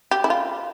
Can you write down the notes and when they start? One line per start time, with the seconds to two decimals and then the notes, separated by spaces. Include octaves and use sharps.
0.11 G4
0.24 E4
0.30 F4